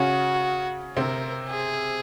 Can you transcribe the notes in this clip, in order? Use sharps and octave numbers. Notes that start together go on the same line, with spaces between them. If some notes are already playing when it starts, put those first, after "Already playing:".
Already playing: C#3 C#4 F#4
C3 C4 A#4
G#4